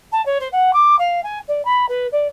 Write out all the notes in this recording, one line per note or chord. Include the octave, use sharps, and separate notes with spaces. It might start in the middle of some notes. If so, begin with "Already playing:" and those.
A5
C#5
C5
F#5
D6
F5
G#5
D5
B5
B4
D5